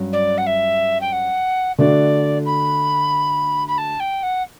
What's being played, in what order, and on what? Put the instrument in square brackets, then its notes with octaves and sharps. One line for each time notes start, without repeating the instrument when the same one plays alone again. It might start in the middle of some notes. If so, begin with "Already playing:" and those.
Already playing: [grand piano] G2 F#3 C#4
[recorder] D5
F#5
E5
G5
F#5
[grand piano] D3 A3 D4 F#4 [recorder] D5
[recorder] B5
B5
A5
G5
F#5